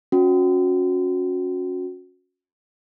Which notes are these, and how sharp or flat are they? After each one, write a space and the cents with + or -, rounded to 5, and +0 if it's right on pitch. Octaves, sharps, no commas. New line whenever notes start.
C#4 +0 F#4 -25